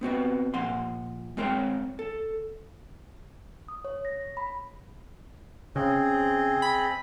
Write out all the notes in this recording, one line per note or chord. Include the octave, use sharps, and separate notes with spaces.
B3 C4 F#4 B4
A#2 F3 F#5 C6
G#3 C4 A#4 C5 C#5 G5
A4
D#6
C#5
A#6
B5
C#3 C4 G#4 D#5
B5